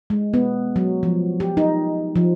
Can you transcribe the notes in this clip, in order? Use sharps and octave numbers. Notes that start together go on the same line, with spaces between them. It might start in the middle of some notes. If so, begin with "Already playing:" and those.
G#3
B3
F#3
F3
G4
D#4
F3